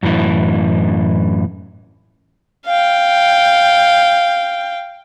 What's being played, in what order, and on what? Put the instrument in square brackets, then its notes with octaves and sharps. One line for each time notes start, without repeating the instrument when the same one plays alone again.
[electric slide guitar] F#2 A2 E3
[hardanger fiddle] F5 G5